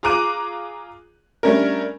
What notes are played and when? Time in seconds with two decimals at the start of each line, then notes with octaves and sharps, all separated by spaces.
0.03 F4 G#4 A#5 D6 F#6 D#7
1.43 G3 A3 C#4 D4 A#4